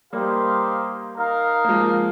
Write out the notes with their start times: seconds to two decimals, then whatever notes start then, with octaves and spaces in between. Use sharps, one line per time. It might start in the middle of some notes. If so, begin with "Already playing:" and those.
0.13 G3 A#3 D#4 G4 C5 F5
1.18 D#4 A#4 F5
1.64 A#3
1.69 F3 G#3